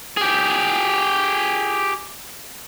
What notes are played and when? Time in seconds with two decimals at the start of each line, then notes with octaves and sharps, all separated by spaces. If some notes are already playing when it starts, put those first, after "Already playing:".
0.17 G4 G#4